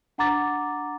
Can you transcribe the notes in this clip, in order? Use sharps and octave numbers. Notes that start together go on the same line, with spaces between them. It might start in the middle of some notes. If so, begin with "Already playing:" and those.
D4 F#5 A#5 D6 A6